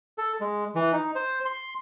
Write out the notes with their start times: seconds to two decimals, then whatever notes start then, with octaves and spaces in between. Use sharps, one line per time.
0.18 A4
0.41 G#3
0.75 E3
0.93 D#4
1.15 C5
1.45 C6